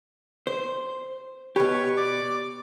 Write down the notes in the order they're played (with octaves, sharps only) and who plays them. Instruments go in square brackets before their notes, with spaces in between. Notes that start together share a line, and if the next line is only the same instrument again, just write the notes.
[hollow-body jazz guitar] C5
[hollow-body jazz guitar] B2 G4 [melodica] B4 C#5 C#6
[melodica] D5 D6